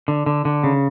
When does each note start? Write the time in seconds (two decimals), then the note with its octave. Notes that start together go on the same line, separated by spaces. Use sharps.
0.08 D3
0.26 D3
0.45 D3
0.64 C#3